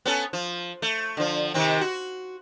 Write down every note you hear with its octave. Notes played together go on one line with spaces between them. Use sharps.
B3 C#4 A4
F3
A3
D3 F3
C3 D#3 C4
F#4